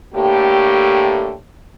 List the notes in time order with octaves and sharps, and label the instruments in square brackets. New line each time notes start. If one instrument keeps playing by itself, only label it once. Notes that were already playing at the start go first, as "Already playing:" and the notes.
[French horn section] A2 D3 A3 A#3 G4